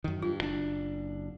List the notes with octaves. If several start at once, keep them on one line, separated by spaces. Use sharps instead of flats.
F#2 D#3
G2 F4
F#1 D4